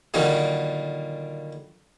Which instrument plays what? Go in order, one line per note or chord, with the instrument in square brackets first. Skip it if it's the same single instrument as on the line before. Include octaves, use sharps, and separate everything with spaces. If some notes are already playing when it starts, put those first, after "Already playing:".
[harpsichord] A#2 D3 D#3 F#3 G3 A#3